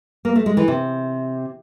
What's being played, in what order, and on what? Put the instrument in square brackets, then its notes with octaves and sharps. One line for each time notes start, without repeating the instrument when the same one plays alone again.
[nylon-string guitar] A#3
A3
G#3
E3
C3